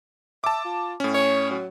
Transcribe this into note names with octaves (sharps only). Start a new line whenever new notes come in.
E5 A5 D6
F4
A2 C#4
C#5
F#3